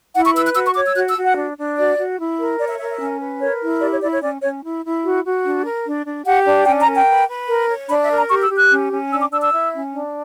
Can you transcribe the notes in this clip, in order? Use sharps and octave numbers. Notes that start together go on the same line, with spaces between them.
E4 F#5
C#6
B4 E6
F#6
F#4 E6
C#6
C#5 D6
E6
F#4 F#6
E6
F#4
F#5
D4
D4
F#4 D5
F#4
E4
A#4
C#5 D5
E5
A#4 E5
E5
C#4
B4
A#4 C#5
E4
G4 D5
C#5
E4 D5
C#5
C#4 D5
C#4 C#5
E4
E4
F#4
F#4
D4
A#4
D4
D4
G4 F#5
D4
C#4 G5
A#5
A#4
G5
B4
B4
A#4
C#5
D4 B5
E5
A#4
A#5
G4 C#6
E6
G4
F#6
C#4
C#4
D4 E6
D6
D4 E6
E6
E4
C#4
D4